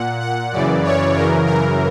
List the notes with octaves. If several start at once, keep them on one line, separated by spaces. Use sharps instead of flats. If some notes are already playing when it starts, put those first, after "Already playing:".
Already playing: A#2 F#5
F#5
F#2 C#3 E3 D5
C#5
F#2 C#3 E3 A#4
A#4